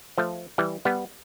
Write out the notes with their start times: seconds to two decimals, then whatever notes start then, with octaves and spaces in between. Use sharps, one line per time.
0.18 F3 A3
0.58 E3 G3
0.85 G3 B3